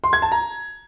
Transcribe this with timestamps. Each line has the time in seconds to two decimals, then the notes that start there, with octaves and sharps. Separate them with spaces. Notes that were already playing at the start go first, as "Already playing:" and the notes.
0.04 C6
0.13 G#6
0.22 A5
0.32 A#5